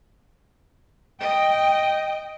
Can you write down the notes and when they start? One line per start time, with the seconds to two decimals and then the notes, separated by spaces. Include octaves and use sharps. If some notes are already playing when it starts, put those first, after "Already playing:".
1.20 D#5 G5